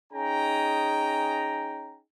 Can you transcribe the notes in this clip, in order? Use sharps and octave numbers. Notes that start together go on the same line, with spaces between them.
C#4 D#4 G#4 G5 G#5 A#5